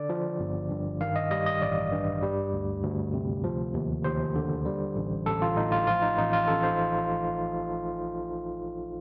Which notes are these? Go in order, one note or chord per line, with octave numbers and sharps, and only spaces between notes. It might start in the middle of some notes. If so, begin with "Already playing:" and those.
Already playing: D3 D5
F3
G1
G2
D#3 F5
D#5
G3 D#5
D#5
A1 D5
G2
G3
D2
D2
C3
F3
D#2
D#2 C5
D3
G3
A1
A1 A4
F4
A2 D#4
F4
F3 F4
D#4
A1 D#4
F4
A1 A4
C5